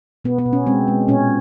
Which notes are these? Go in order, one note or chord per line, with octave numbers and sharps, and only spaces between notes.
B2 B3
B3
B2
C#4
G#3 C4
G#3
A#2 C#4